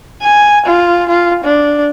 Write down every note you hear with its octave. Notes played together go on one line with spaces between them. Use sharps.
G#5
F4
F4
D4